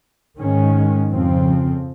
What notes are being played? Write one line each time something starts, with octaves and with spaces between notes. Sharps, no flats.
G#2 D#3 G#3 C#4
F2 C#3 F3 C4